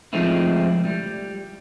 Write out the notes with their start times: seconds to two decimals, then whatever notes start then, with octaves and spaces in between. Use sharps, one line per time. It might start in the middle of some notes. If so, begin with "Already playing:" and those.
0.13 F3 G#3 A3 C4 D#4 E4
0.85 G3